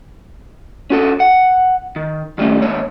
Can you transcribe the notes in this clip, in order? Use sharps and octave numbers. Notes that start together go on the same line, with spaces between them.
C#4 F#4 A4
F#5
D#3
D#3 G3 A3 C#4
D#2 G#2 C#5